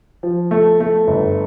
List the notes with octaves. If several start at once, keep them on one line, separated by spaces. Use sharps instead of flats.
F3
A3
A3
G1